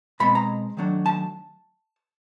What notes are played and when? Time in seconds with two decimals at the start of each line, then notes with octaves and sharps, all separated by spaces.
0.20 B2 G#3 C4 B5
0.35 A#5
0.77 D#3 F#3 A3 D4
1.06 A5